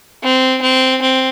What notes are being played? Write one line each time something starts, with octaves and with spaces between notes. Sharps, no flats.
C4
C4
C4